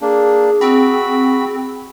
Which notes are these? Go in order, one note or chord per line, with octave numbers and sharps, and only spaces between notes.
A#3 D4 G#4
C4 F#4 B5